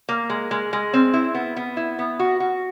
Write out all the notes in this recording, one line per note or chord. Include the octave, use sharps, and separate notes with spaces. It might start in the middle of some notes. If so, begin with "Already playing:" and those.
A#3
G#3
G#3
G#3
C4
E4
B3
B3
E4
B3
F#4
F#4